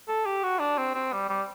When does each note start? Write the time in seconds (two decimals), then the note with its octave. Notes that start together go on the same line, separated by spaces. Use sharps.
0.08 A4
0.26 G4
0.43 F#4
0.59 D4
0.78 C4
0.95 C4
1.13 G3
1.29 G3